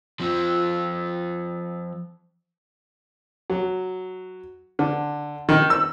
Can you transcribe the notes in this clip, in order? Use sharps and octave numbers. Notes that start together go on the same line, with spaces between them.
F3 C4
F#3
D3
D#3
E6